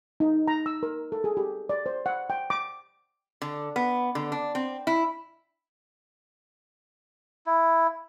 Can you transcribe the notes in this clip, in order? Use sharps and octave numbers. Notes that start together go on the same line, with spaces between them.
D#4
A#5
E6
A#4
A4
G#4
G4
D5
C5
F#5
G5
D6
D3
B3
D3
D4
C4
E4
E4